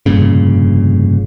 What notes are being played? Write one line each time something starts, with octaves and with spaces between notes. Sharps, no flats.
F1 G2 A#2 C#3